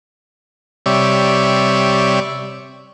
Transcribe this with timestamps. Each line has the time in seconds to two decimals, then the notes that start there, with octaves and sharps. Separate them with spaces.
0.86 C3 G3 C#5 D5 E5